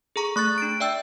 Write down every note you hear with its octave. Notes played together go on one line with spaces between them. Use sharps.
G#4 A4 A#5 C#6
A3 C#6 F#6 A6
D4 A6 D7
D5 E5 G5 E6